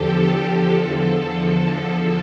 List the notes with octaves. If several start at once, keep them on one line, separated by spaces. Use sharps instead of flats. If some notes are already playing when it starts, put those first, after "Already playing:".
Already playing: E2 D3 F3 G4 A4
A4
E2 D3 F3